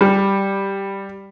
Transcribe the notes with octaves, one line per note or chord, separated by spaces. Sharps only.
G3